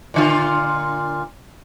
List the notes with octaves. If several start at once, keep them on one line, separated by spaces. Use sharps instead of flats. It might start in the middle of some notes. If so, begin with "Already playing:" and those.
A#2 D3 F4